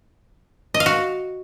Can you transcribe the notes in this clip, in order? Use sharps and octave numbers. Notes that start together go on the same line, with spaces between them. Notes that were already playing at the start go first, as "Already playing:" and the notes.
D#5
F5
F#4